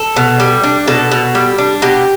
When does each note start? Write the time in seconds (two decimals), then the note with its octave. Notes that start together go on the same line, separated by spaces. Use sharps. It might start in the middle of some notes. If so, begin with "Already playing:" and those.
Already playing: A4
0.16 B2
0.40 G3
0.63 D4
0.87 B2 A4
1.11 B2
1.35 G3
1.58 D4
1.82 B2 G4